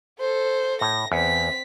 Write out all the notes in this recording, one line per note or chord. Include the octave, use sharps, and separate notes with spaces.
A4 C5
A2 A#6
E2 C4 B6